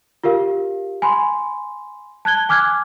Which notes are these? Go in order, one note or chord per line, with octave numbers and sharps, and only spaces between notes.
F4 G4 A#4 F5
G#5 B5 C6
A5 F#6 G#6 G7
G#5 D6 F6 F#6 G#6